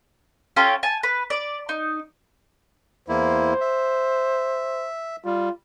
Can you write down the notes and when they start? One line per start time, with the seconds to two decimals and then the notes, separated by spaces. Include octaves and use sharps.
0.56 C#4 F4 G4 A4
0.83 G#5 A5
1.03 B4
1.30 D5
1.69 D#4
3.09 E2 A#3 E4 C5
3.61 E5
5.25 G3 F4